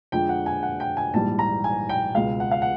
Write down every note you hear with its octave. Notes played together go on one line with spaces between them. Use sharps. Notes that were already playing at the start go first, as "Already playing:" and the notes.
F2 D3 F3 G#3 G5
F#5
G#5
F#5
G5
G#5
A#1 G#2 E3 G3 A5
A#5
G#5
G5
C#2 B2 G#3 F5
F#5
F5
F#5